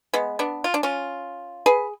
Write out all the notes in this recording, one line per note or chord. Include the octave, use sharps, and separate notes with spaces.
G#3 B3
B3 D4
F4
D4
C#4 F4
G#4 B4